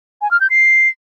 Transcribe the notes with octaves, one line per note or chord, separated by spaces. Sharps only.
G#5
F6
G6
C7